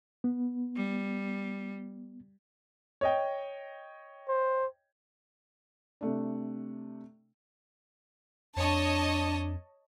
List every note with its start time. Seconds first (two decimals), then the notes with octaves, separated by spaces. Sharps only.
0.24 B3
0.75 G3
3.01 C#5 D#5 G5
4.28 C5
6.01 C3 A3 D4
8.56 F2 D4 C#5 D#5 A5